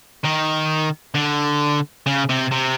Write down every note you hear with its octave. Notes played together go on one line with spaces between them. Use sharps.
D#3
D3
C#3
C3
C3